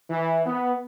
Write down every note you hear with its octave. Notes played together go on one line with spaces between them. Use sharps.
E3
B3